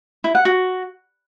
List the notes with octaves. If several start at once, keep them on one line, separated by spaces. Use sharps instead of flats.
E4
F#5
F#4